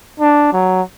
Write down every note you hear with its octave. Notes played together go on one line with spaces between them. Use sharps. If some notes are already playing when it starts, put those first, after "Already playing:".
D4
F#3